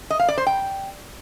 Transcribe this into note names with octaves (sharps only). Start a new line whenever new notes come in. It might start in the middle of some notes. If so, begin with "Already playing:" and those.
D#5
F5
D5
C5
G5